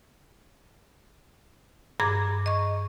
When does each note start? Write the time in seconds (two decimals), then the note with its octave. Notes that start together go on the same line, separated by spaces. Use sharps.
2.00 G2 G#4 A#5 D6 G#6
2.46 D#5 C#6